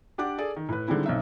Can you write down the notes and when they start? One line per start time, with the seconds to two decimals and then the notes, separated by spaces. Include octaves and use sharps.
0.18 D4 G4 D5 F#5 D6
0.38 G#4 A4 D5
0.57 D#3
0.69 A2 B4
0.88 D3 D#3 G3 G#3 C4 E4
1.06 B1 C4 D#4 E5